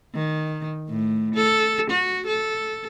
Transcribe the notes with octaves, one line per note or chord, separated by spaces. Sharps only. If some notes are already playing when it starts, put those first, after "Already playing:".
D#3
A2
A4
F#4
A4